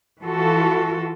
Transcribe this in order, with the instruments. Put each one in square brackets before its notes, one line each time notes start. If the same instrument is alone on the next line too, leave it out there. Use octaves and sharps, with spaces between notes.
[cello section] E3 F4 F#4 A4